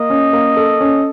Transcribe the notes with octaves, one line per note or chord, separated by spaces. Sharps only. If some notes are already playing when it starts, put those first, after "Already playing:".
Already playing: A#3 D#5
C#4
A#3
A4
C#4